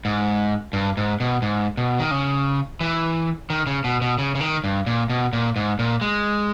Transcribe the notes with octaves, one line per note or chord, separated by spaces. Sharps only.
G#2
G2
G#2
B2
G#2
B2
D#3
C#3
E3
D#3
C#3
B2
B2
C#3
C#3
D#3
G2
A#2
B2
A#2
G#2
A#2
G#3